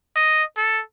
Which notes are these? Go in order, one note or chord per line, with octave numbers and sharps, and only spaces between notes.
D#5
A4